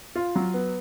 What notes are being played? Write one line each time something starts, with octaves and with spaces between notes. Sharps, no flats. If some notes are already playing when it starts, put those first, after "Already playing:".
F4
F#3
B3